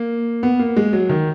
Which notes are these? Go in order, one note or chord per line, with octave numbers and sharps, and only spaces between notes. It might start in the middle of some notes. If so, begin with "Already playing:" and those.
Already playing: A#3
B3
A#3
G#3
F#3
D#3